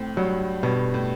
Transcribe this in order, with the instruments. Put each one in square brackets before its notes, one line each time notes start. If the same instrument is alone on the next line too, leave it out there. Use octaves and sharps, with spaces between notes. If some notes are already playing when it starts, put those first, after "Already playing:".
Already playing: [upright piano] A2 [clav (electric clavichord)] C4
[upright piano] G2 [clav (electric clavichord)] F#3
[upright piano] G2 [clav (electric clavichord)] B2
[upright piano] A2